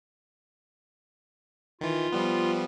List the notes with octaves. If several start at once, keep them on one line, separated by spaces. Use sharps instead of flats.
D#3 E3 F4
F3 G3 B3